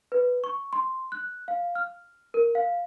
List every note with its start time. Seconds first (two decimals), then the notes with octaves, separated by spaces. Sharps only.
0.12 B4
0.44 C#6
0.73 C6
1.12 F#6
1.48 F5
1.75 F6
2.34 A#4
2.55 F5